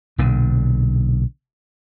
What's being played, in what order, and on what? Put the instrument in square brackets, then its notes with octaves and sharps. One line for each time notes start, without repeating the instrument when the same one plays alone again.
[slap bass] B1 A#2 D3